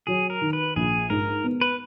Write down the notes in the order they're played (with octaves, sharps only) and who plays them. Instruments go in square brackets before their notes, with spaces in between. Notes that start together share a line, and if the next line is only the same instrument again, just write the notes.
[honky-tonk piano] F#3 [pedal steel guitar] G#4
[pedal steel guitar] A#4
[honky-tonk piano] D#3
[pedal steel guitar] B4
[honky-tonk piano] A#1 [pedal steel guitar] G#4
[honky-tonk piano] G#2 [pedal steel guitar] A#4
[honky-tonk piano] B3
[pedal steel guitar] B4